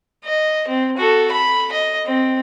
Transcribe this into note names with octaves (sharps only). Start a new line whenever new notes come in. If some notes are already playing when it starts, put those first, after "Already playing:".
D#5
C4
F#4 A4
B5
D#5
C4